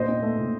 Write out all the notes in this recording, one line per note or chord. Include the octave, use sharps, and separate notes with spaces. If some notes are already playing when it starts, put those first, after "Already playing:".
Already playing: A#2 D4 C5 D#5
C4
A3
A#2